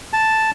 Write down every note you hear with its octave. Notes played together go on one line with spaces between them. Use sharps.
A5